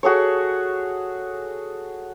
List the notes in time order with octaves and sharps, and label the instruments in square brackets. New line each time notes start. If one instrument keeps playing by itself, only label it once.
[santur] F#4 G#4 A4 C#5